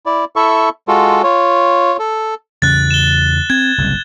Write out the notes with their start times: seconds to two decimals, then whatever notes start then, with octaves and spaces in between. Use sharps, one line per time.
0.06 E4 D5
0.36 E4 A4 E5 C#6
0.88 G#3 F4 F#4 A4
1.23 F4 C#5
1.99 A4
2.62 E2 C#3 C#4 F#6 A6
2.91 E7 G7
3.50 C4 G#6
3.78 F#1 C2 G#2